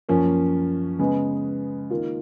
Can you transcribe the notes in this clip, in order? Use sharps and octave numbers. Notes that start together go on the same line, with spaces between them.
F#2 F3 A#3 C#4
C#3 G#3 B3
D#3 A#3 F4